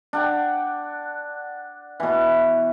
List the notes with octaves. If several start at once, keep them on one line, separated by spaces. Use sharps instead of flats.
D4 F#5 G5
B2 E3